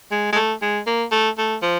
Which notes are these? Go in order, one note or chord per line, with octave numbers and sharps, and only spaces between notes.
G#3
G#3
A3
G#3
A#3
A3
A3
F3